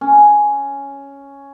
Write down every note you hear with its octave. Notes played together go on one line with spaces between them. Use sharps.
C#4